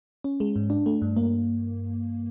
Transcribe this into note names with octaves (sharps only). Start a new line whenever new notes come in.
C#4
G#3
G#2
D4
A3
G2
A#3